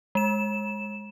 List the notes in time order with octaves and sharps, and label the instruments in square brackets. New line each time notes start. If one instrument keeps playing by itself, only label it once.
[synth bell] G#3 E7